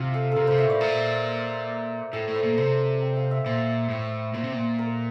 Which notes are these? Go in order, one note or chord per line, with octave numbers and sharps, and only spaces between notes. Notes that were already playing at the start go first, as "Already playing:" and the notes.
Already playing: C3 F4
A4
C3 A4 A#4
C3 C5
E5
A2 D5
A#2 A#4
A2 A4
A2
C5
A#2
C3 C5
G5
F5
E5
A#2 C5
A2
A#2 C5
C3
A#2
A#4